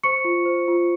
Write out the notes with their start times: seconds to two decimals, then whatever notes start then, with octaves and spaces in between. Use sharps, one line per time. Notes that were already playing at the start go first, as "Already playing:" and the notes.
0.03 C5 C#6 C#7
0.24 F4
0.45 C5
0.68 F4